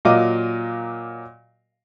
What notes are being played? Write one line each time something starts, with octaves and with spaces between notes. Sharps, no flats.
A#2 F#3 A#4 D#5 F5 D6